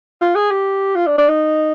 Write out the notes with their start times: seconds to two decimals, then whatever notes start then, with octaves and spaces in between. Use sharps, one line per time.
0.21 F4
0.36 G#4
0.51 G4
0.95 F4
1.07 D4
1.18 D4
1.28 D#4